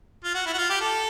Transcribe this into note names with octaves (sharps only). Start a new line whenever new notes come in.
F4
F#4
E4
F#4
F4
G4
A4